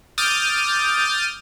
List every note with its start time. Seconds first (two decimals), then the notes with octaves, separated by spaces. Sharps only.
0.18 D6 D#6 F6 G6 A6